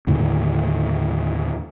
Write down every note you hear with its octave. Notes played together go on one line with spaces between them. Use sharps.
D#2 A2 D3 D#3